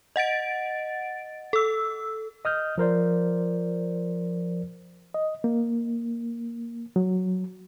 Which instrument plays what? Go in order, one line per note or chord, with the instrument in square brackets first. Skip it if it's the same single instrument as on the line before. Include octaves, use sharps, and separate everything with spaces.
[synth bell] D#5 F#5 A6 D7
A4 E6
[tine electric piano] D#5 D#6 F6 G6
F3 A#4 C5 D5
[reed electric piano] D#5
A#3
F#3